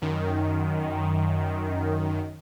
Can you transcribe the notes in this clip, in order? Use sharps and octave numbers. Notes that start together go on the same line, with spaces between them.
F#2 D#3